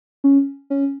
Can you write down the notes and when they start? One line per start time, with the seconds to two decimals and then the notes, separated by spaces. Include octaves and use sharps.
0.24 C#4
0.70 C#4